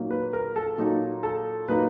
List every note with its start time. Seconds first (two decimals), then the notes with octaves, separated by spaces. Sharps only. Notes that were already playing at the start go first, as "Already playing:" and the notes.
Already playing: A#2 F#3 A#3 D#4
0.11 B4
0.33 A#4
0.56 A4
0.78 A#2 F#3 A#3 D#4
1.23 A4
1.68 A#2 F#3 A#3 D#4 B4